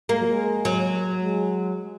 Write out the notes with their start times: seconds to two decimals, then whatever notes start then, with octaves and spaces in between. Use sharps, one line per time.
0.09 G#3 A#3
0.19 F#3
0.28 G#3
0.65 F#3
1.20 G#3